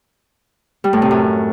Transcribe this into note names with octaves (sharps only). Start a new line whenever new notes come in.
G3
A2
C3
F#2